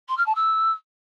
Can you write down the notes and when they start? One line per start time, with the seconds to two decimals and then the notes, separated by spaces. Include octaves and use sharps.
0.08 C6
0.17 F6
0.26 A5
0.35 E6